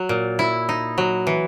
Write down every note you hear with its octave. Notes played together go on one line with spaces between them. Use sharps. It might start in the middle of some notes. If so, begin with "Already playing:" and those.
Already playing: F#3
A#2
E4
D#4
F#3
E3